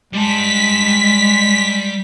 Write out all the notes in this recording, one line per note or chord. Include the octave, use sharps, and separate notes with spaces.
G3 G#3 A5 B6